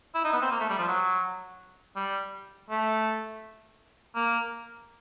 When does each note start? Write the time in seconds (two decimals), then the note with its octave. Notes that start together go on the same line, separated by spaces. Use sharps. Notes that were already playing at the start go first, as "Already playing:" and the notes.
0.15 E4
0.24 D#4
0.33 B3
0.42 C4
0.51 A#3
0.60 A3
0.69 G3
0.78 F3
0.88 F#3
1.96 G3
2.70 A3
4.15 A#3